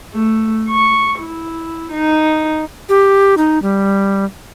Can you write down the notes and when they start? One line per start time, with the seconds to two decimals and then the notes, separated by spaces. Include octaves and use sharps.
0.12 A3
0.69 C#6
1.19 E4
1.92 D#4
2.89 G4
3.37 D#4
3.62 G3